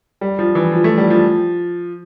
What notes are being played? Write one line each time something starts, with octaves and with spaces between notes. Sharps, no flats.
G3
F3
E3
F3
A3
G3
F3